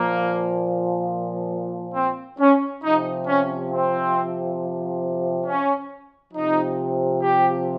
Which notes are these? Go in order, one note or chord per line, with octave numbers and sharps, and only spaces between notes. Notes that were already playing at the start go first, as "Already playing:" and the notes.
Already playing: A#2 F3 A#3
C4
C#4
C3 F3 D#4
C#4
C4
C#4
C3 F3 D#4
G4